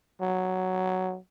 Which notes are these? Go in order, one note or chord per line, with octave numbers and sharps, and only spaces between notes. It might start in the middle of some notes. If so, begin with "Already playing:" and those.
F#3